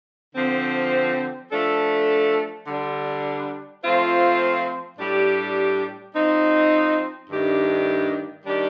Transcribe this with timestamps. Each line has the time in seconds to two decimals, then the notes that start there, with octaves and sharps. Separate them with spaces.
0.34 D3 F3 C4
1.51 F3 A3 D4 A4
2.66 D3 G3 D4
3.82 F3 A3 C4 F4 C5
4.99 A2 G3 D4 G4
6.14 F3 C4 D#4
7.30 G2 D#3 A3 D4 G4
8.46 D#3 G3 D4 G4 D5